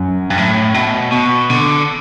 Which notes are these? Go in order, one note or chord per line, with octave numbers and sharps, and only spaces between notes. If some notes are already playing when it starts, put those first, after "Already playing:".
Already playing: F#2
G2
A2
B2
B2
D3